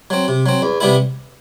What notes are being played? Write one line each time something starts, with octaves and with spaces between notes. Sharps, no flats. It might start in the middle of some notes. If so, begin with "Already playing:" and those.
F#3 C4
C3
F#3 C4
E2
C3 G3 B3 E4